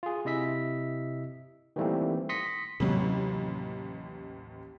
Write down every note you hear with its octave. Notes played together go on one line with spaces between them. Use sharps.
F4 G#4
C3 E4 D#5 E5 B6
D#3 E3 G3 A3 A#3 C4
C6 D#6 A#6 B6 C#7
A1 D#2 C3 F#3